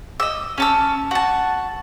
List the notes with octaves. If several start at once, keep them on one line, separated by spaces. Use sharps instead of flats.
D#5 E6
C#4 A5 E6
F#4 A5